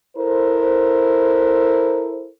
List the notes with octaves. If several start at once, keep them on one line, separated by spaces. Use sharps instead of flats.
E4 A4 A#4 C5